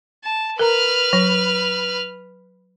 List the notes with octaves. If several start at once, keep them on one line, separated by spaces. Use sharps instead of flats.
A5
A#4 B4 A#5 F6
F#3